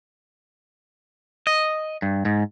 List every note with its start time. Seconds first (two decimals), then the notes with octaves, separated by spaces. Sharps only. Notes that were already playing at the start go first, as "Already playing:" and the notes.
1.47 D#5
2.02 G2
2.25 G#2